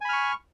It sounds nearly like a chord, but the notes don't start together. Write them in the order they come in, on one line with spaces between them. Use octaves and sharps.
G#5 B5 F6 C#6